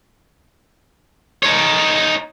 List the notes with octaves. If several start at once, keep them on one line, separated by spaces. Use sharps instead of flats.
D#4 C#5